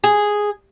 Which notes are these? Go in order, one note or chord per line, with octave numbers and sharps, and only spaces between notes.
G#4